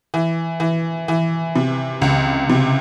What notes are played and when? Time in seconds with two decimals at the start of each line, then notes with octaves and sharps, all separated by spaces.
0.14 E3
0.60 E3
1.08 E3
1.56 C3
2.02 C#2
2.49 C3